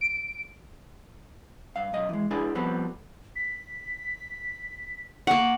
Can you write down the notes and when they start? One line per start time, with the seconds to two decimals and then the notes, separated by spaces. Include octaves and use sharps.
0.01 D7
1.76 G2 F5
1.93 B1 F#2 D#5
2.09 E3 G#3
2.31 D4 E4 G#4 B4 D5 G#5
2.55 F3 G3 B3 C4 A4 B4
3.36 B6
5.27 A#3 F#5 C#6